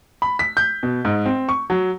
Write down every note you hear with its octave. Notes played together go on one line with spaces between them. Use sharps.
B5
B6
G6
B2
G#2
C4
C#6
F#3